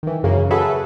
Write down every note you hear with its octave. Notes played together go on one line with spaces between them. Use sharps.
D#3 E3
F#2 C#3 A#3 C#4
F#4 G#4 A4 B4 E5